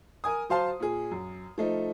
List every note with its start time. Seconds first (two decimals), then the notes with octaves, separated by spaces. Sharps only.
0.24 A#4 G#5 D#6
0.50 F#3 C5 F5 A5 C6
0.80 A#2 G#4
1.11 F#2
1.58 F3 A3 D#4